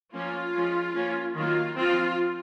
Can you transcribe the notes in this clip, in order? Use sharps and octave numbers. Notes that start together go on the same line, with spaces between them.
F3 A#3 C#4 F4
F3 G#3 C#4
F3 A#3 C#4
D#3 F#3 A#3 F4
F3 C4 F4